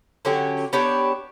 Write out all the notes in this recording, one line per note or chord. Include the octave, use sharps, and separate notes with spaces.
D3 F#3 C#4 G4
B3 D4 G4 C#5